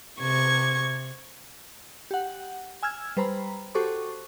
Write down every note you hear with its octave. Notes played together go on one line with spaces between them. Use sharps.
C3 C#6 G#6
G4 F#5
G#5 E6 F6 G#6
G3 B4 C5 A#5 B5
F#4 G4 A4 C5 C#6 D6